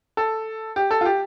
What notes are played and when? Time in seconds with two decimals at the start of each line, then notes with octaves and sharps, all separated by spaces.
0.17 A4
0.76 G4
0.91 A4
1.01 F4
1.05 G4